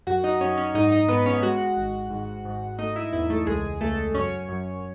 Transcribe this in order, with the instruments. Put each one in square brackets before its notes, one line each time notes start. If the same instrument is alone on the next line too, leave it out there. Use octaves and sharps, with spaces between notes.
[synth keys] F#2 F#4 F#5
D#4 D#5
F#2 C#4 C#5
C#4 C#5
G#2 D#4 D#5
D#4 D#5
G#2 B3 B4
C#4 C#5
G#3 F#4 F#5
G#1
G#2
G#2
A3 D#4 D#5
E4 E5
E2 E4 E5
A3 A4
C#2 G#3 G#4
C#2 A3 A4
F#2 C#4 C#5
F#2